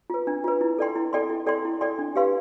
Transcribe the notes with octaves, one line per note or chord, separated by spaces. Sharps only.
F4 B4
D4
F4 B4
E4
A4 D5 G5 C6
E4
A4 D5 G5 C6
E4
A4 D5 G5 C6
E4
A4 D5 G5 C6
D4
G4 B4 F5 C6